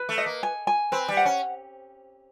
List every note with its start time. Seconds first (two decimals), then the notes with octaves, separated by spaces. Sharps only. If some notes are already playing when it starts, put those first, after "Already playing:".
Already playing: B4
0.09 A3
0.18 D#5
0.26 A#3
0.43 G#5
0.67 G#5
0.92 C4 B4
1.08 G3
1.17 F#5
1.25 C#4